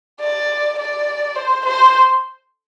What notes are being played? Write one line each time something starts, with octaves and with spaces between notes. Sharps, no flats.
D5
D5
C5
C5